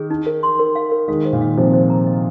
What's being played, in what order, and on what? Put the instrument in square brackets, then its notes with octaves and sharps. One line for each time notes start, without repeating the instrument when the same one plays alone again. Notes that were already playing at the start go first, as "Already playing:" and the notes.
Already playing: [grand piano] D#3 [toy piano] G#4
[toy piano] D#4
A#4
C6
A#4
F5
A#4
[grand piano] D#3 G#3 [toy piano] F5
[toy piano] C5
[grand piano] A#2 D#3
[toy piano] F5
[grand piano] C3 F3 [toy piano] C5
[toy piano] C5
A#5
D#5